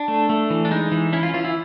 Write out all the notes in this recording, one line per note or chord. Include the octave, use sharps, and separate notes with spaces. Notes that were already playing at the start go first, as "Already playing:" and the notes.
Already playing: D4
A3
A3
E3
D4
G#3 D#4
E3
C#4 E4
F4
E3 F4
E4